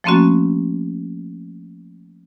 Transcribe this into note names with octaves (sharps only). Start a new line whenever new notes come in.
F3 A3 A#3 C4 C#4 F#4